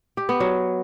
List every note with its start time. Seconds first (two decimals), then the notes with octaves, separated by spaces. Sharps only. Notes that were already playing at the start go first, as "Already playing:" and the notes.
0.17 G4
0.29 B3
0.40 F#3